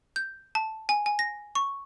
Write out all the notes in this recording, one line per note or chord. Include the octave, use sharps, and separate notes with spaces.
G6
A5
G#5
G#5
A#6
C#6